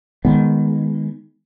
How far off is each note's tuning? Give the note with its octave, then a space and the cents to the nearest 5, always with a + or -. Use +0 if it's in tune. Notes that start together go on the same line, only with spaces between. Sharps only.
D#3 +0 G#3 +0 B3 +0